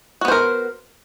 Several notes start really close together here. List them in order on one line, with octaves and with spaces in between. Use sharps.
F#4 B3 C5 A#4